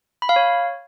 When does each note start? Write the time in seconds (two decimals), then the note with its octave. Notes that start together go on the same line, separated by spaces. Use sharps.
0.22 B5
0.29 F5
0.36 C#5